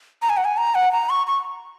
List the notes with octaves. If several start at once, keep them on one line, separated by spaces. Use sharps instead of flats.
A#5
G#5
F#5
G#5
A#5
F#5
A#5
C#6
C#6